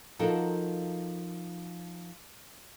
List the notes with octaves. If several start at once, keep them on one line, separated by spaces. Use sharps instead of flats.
F3 D#4 F#4 A4 A#4